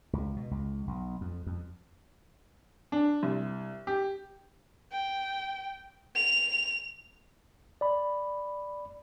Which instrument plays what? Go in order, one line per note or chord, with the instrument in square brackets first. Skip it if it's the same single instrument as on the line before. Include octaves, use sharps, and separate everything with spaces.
[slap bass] C#2
B2
C#2
B1
F2
F2
[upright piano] D4
C2
G4
[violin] G5
F7
[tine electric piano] D5 B5